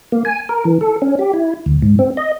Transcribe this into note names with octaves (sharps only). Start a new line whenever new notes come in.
A#3
G#5
A#4
E3
A4
C#4
G4
E4
D2
G#2
C4
D#5